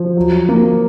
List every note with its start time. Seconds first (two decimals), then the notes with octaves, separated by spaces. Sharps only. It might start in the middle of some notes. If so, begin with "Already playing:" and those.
Already playing: F3
0.17 F#3
0.49 A#3